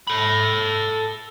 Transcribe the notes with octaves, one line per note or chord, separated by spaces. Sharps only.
A4 B5